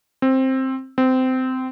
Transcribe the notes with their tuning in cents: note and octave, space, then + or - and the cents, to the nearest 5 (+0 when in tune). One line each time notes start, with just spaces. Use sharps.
C4 +10
C4 -20